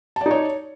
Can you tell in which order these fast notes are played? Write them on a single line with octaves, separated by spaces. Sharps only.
A5 D5 D#4 C#5